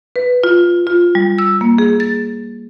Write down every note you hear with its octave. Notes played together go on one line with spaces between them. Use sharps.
B4
F4
F4
G3
E6
A#3
G#4
A6